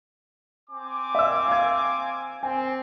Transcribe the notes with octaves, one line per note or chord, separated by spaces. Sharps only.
C4 G#5 D6
E5 E6
F5 G#6
C4 G#5